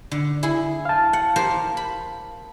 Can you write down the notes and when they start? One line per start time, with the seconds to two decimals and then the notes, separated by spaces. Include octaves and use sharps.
0.11 D3
0.43 E4 G#4
0.85 F5 A5
1.13 F#5
1.36 G4 A#4 C5
1.77 B5